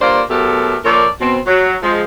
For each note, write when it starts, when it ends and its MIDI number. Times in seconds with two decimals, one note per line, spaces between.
0.01 0.21 43
0.01 0.21 58
0.01 0.21 65
0.01 0.21 72
0.01 0.21 74
0.30 0.76 47
0.30 0.76 54
0.30 0.76 57
0.30 0.76 67
0.30 0.76 69
0.30 0.76 70
0.85 1.07 46
0.85 1.07 53
0.85 1.07 69
0.85 1.07 70
0.85 1.07 73
0.85 1.07 74
1.20 1.38 47
1.20 1.38 60
1.46 1.75 54
1.83 2.02 53
1.83 2.02 56